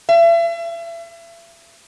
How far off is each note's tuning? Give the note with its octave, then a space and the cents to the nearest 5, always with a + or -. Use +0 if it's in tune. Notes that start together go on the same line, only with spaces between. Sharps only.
E5 +35